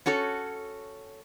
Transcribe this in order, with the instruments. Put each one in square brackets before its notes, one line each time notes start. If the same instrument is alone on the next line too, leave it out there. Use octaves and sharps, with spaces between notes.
[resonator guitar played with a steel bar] C#4 F#4 A4 C#5